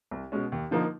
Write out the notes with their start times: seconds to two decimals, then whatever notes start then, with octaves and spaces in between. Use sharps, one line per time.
0.11 C2
0.32 B2 G#3 C#4
0.52 D#2
0.71 D3 F3 A#3 D#4